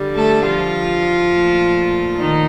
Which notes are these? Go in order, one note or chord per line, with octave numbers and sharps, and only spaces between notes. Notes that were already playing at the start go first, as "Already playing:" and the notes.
Already playing: D3 G3
A3 A4
F3 F4
A#2 A3
D#3 D#4